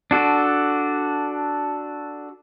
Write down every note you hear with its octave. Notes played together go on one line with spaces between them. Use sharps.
D4 F#4 A4